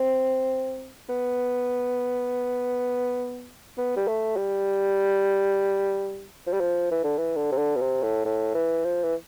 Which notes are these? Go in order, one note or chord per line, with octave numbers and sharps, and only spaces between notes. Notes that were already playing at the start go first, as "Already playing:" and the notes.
Already playing: C4
B3
B3
G3
A3
G3
F3
G3
F3
E3
D3
E3
D3
C3
D3
B2
C3
A2
A2
E3
F3
E3